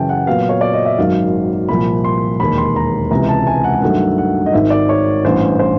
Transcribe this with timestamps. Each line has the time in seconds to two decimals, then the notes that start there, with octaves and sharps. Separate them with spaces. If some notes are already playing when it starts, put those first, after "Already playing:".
Already playing: F#2 C#3 E3 G5 A5
0.09 F#5
0.27 A#2 F#3 B3 F5
0.49 C#5
0.61 D5
0.74 D#5
0.85 E5
0.98 G#1 F#2 D#3 F#3 F5
1.69 C2 A#2 F3 B5
2.04 C6
2.40 E1 D#2 D#3 B5
2.58 C6
2.76 A#5
3.11 C#2 C3 E3 A#5
3.28 A5
3.47 G#5
3.64 F#5
3.82 G2 D#3 F#3 A3 F#5
4.18 F#5
4.46 D#5
4.53 G#1 G#2 D#3 E5
4.70 D5
4.89 C#5
5.25 A1 G2 E3 C5
5.59 C5